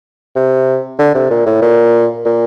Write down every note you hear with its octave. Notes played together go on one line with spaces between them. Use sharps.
C3
D3
C3
A#2
A2
A#2
A#2